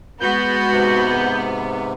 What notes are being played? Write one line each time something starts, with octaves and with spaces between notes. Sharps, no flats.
G#3 B3 F#4 G6
G#2 C3